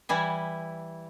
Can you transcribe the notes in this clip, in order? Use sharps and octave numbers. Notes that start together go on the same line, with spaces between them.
E3 G3 E4 G#5